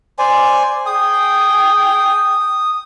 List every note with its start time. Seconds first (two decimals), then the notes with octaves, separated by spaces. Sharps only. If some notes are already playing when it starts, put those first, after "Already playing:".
0.19 C5 D5 G#5
0.86 G#4 G5 D#6